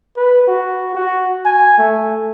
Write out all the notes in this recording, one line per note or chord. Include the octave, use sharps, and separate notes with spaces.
B4
F#4
F#4
G#5
A3